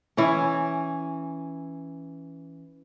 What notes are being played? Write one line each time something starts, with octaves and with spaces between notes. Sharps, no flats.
E3 C#4